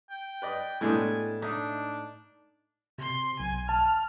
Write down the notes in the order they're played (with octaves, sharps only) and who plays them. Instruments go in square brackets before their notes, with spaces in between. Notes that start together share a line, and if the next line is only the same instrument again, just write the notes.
[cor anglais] G5
[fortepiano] B4 D5 D#5
[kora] A2 G#3 [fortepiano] G3 B3 D4 [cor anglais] G#5
[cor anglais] D4 [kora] D#4 [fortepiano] E5
[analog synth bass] C3 [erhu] C6
[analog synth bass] B1 [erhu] G#5
[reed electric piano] A5 [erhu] F6